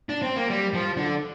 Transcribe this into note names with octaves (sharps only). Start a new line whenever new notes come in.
D4
C4
A#3
G3
F3
D3